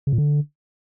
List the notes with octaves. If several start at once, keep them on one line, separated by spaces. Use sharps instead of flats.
C#3
A#2
D3